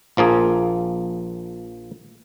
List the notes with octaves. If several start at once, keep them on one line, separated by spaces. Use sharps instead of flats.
A#1 F3 A#3 G#4